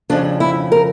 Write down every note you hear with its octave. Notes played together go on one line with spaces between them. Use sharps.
F2 C#3 F3 D4
E4
A#4